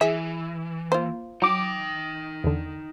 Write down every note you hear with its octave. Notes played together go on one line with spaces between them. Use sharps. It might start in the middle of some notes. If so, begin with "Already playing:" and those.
E3 G#4 E5
A#3 F4 C5
F#3 D#4 G5 D6
E2 D3